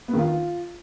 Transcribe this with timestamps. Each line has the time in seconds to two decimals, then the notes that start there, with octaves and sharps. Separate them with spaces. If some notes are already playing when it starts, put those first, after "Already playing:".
0.08 B3
0.14 D#3
0.19 F4